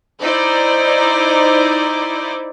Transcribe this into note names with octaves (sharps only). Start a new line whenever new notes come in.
D#4 E4 C5 D5